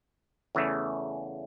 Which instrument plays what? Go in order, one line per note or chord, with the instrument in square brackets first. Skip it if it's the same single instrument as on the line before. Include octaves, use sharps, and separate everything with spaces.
[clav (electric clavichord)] E2 C#3 E3 A3